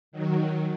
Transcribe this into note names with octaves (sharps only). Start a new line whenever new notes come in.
D#3 F#3